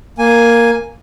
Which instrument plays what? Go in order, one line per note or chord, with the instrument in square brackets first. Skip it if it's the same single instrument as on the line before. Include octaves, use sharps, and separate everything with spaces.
[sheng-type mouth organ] A#3 G#5